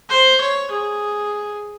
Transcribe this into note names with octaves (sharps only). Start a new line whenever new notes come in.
C5
C#5
G#4